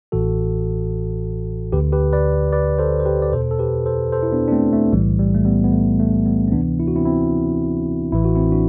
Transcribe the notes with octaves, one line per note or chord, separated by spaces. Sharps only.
A1 A2 E3 F#4 A4
D2 D3 G4 B4
G4 B4
B4 D5
B4 D5
A4 C5
C5
G4 B4
D5
E2 B2 A4 C5
A4
G4 B4
A4 C5
A4 C5
E4
B3 D4
D4
A3 C4
A3
B1 A2 E3 G3
G3
A3
G3 B3
B3
A3
A3
G3 B3
C4
D2 C3 E3 B3 D4
E4
F#4
C4 E4
C4 E4
A1 A2 E3 E4
F#4
C4 E4
D4 F#4